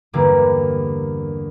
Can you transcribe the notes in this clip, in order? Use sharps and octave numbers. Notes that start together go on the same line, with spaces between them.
E2 G2 D3 G3 A#3 D4